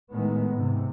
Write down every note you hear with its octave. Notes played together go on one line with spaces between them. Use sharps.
A2 D#3 G#3 B3
G#2 C3